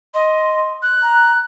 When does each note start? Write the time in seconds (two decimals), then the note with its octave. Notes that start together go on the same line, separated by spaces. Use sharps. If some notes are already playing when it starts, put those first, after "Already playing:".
0.14 D#5 C6
0.83 F#6
1.03 A#5